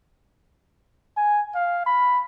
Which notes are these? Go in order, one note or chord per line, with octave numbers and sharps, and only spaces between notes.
G#5
F5
B5